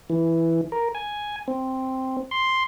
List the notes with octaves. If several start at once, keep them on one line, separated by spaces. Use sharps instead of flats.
E3
A#4
G#5
C4
C6